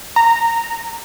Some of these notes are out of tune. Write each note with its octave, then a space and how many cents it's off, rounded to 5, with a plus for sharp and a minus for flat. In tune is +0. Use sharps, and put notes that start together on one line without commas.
A#5 -15